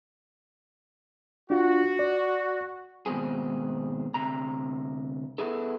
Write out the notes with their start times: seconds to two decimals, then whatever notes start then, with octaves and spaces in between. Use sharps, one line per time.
1.50 D4 F4 F#4
1.99 D5
3.06 D#2 G#2 B2 C4 G#4
4.14 D2 C3 A#5
5.38 B3 E4 G#4 A4